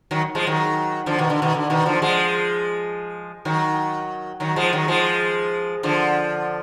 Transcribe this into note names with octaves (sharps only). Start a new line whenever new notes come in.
D#3 F#3
F3 G#3
D#3 F#3
D3 F3
B2 D#3
D3
B2 D#3
D3
B2 D#3
D3 F3
F3 G#3
D#3 F#3
D#3 F#3
F3 G#3
D#3 F#3
F3 G#3
D3 F3